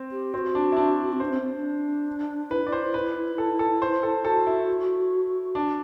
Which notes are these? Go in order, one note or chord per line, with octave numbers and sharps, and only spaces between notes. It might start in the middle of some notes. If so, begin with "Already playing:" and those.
Already playing: C4
G4
C4 F#4
D4
E4
D4
C4
D4 C5
C4
C4
D4
E4 B4
D5
C5
B4
A4
A4
C5
A4
F#4 A4
E4
D4